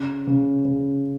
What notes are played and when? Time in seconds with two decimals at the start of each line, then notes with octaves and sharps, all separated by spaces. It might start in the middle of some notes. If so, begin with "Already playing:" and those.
Already playing: C#3
0.27 C#3
0.65 C#3